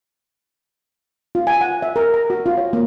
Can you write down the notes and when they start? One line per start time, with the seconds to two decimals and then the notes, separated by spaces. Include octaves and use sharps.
1.35 F4
1.47 G#5
1.61 F#5
1.82 E5
1.96 A#4
2.14 A#5
2.30 F#4
2.46 F4
2.57 C#5
2.73 A#3